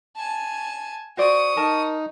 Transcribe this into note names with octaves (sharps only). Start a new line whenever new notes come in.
G#5 A5
F#4 C5 D5 C#6 D#6
D#4 A#4 A5